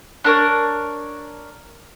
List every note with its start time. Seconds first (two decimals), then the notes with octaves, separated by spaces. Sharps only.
0.24 D4 A#4 C#5